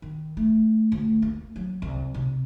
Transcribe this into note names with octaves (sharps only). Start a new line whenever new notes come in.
D#3
A3
D2
A#3
F#3
C2
C3